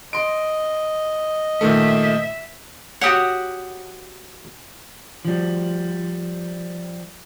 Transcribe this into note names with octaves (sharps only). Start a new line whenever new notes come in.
D#5 C6 D7
A#2 D#3 A3 E5
F#4 G4 C#5 F#5 D#6
F3 G3